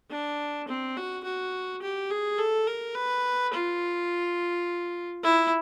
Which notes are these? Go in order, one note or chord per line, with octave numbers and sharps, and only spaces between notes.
D4
C4
F#4
F#4
G4
G#4
A4
A#4
B4
F4
E4